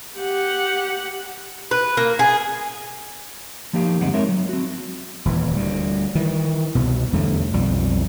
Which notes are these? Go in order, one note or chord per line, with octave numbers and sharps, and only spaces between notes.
G4 F#5
B4
A#3
G#4
F3 A#3 D#4 G4 F5
D2 G2 G#3 C4 D#4 F#5
G#3 C4 D#4 A#4 C#5 E5
F#3
C4 F#4
D#1 E3
D2 G3
D#3 E3
C2 B2
E2 G2 D3 A3
B1 F2 G3